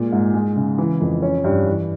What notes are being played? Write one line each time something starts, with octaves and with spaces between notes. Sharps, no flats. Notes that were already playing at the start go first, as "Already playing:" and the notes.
Already playing: A#2 G#3
G#2
G#3
C#3
E3
F2
C#4
G2
E3